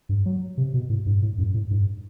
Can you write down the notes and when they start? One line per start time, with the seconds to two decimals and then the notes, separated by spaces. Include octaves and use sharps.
0.09 G2
0.26 F#3
0.58 C3
0.74 B2
0.90 A2
1.06 G2
1.22 A2
1.38 F#2
1.54 A2
1.71 G2